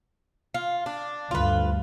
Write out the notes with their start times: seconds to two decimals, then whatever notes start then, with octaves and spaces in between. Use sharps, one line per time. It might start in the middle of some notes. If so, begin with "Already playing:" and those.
0.54 F4
0.86 D4
1.31 D2 G2 F4 B4